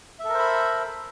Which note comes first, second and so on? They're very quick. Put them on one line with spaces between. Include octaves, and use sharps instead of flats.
E5 A4 A#4 C5 B5